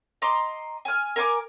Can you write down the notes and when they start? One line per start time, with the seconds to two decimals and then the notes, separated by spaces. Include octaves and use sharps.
0.22 D#5 A#5 C6 D6
0.85 G#5 F6
1.16 A#4 G#5 C6 D6